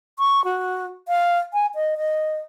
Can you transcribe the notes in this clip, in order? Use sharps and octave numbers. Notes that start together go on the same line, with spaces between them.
C#6
F#4
F5
G#5
D#5
D#5